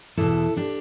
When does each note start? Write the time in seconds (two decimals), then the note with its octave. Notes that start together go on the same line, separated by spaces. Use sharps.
0.17 E2 B2 E4 A4
0.56 D4 G4